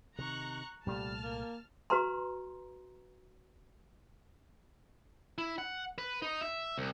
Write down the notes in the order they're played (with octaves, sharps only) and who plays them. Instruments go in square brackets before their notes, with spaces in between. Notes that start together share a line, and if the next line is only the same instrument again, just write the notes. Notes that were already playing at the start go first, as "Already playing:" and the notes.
[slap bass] C3 D#3 [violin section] A#5 C#6 F#6
[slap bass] C2 A#2 A3 [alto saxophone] G3 [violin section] A5 F6
[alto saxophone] A#3
[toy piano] F#4 B4 A#5 C6
[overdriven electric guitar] E4
F#5
B4
D#4
E5
C2